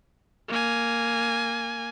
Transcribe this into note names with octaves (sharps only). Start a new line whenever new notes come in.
A#3 G#5